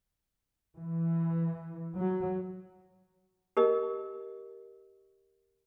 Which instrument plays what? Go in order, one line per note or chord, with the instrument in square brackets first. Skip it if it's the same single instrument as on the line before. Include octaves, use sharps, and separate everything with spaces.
[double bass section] E3
F#3
[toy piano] G4 A#4 D#5